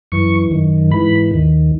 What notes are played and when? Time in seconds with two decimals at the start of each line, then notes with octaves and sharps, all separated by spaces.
0.12 F#2 E3 C#6
0.51 F#2 D#3
0.91 G#2 E3 B5
1.31 D#2 D#3